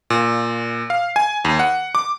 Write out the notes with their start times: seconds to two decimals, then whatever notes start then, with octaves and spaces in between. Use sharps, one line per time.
0.10 A#2
0.90 F5
1.16 G#5
1.45 D#2
1.59 F#5
1.95 D6